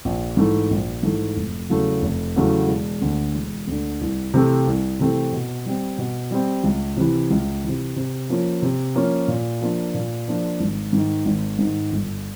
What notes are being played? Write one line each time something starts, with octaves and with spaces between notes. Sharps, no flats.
A#1
G#2 E3 A3
A#1
G#2 E3 A3
F1
E2 C#3 F#3 A3
F1
E2 C#3 F#3 A3
E1
D2 D3
E1
D2 D3
C2
C3 E3 A3 C4
C2
C3 E3 A3 C4
B2
G3 C4
B2
G3 C4
C#2
C3 E3
C#2
E3
C3
C3
F3 A#3 C#4 F4
C3
F3 A#3 C#4 F4
A#2
F3 A#3 D4 F4
A#2
F3 A#3 D4 F4
G#1
G#2 D#3
G#1
G#2 D#3
G1